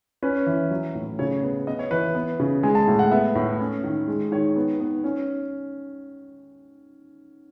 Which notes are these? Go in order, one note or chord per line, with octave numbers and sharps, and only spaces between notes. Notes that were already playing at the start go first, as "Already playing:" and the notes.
C#4 B4
E3
F#3
A2
C#3 C#5
B3
B3 D#5
C#5
E3 B4
B3
C#3
G#3 G#5
A5
A2
F#5
B3 E5
A2
C#4
D#3
G#3
D#3 C#5
B3
B3
C#4